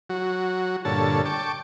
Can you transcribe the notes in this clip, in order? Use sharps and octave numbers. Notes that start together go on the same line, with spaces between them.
F#3 F#4
G2 A#2 D3 A4 C#5 A5
G5 A5 C#6 D6